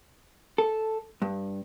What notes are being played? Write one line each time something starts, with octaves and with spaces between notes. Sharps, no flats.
A4
G2